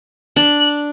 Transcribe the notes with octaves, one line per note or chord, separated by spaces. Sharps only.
D4 F#7